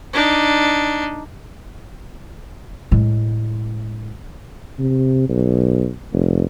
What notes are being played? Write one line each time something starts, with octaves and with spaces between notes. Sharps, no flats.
D4 D#4
A2 G#3
C3
B1
F1